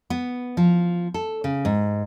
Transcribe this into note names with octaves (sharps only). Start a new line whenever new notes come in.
B3
F3
A4
C#3
G#2